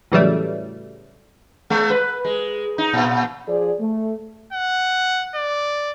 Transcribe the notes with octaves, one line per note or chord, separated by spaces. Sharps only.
A2 C#3 E3 F#3 G3 A3
G#3
B4
G#3
D#4
A#2
F3 G#4 D5
A3
F#5
D5